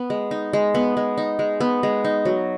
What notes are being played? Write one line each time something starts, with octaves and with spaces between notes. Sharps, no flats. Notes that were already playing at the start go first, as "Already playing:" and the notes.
Already playing: B3
G#3
D#4
G#3
B3
G#3
D#4
G#3
B3
G#3
D#4
F#3